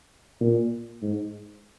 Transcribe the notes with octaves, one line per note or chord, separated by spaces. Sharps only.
A#2
G#2